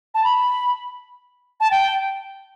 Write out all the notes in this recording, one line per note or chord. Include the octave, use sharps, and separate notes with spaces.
A5
B5
A5
G5